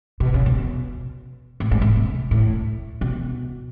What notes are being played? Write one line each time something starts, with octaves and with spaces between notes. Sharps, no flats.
B2
C#3
B2
A2
G#2
A2
B2
A2
B2